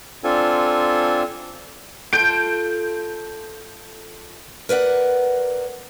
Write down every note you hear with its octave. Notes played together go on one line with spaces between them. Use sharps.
C4 D4 F4 A4 G#5
F4 A4 G6 D7
A#4 B4 D5 F#5